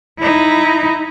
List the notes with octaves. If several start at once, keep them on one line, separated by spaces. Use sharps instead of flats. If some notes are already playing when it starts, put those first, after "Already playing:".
D#4 E4